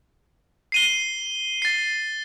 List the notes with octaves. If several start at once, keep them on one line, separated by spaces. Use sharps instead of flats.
C7 D#7 G7
A6 C7